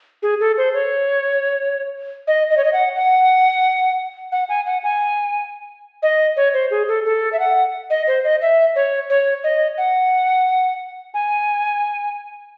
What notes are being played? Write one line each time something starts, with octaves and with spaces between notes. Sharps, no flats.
G#4
A4
C5
C#5
D#5
D#5
C#5
D#5
F#5
F#5
F#5
G#5
F#5
G#5
D#5
C#5
C5
G#4
A4
A4
E5
F#5
D#5
C5
D#5
E5
C#5
C#5
D#5
F#5
G#5